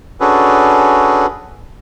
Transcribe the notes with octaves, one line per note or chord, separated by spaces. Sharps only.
C#4 D4 F#4 G#4 A4 B4